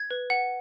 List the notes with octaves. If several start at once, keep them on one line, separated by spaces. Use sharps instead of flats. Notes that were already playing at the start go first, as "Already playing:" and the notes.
Already playing: G#6
B4
F#5